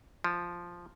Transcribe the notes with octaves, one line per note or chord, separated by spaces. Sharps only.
F3